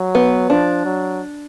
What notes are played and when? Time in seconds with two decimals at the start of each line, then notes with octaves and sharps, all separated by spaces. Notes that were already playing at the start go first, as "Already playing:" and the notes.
Already playing: F#3
0.15 B3
0.50 F3 D4
0.85 F#3